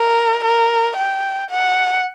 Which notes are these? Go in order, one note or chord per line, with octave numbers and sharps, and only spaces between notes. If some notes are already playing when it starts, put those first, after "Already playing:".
Already playing: A#4
A#4
G5
F#5